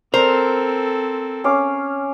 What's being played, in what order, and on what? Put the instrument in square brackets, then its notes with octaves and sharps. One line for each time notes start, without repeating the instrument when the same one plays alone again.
[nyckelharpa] C4 A4 [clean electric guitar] A#4 [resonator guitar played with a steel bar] C5
[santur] C#4 F5 D6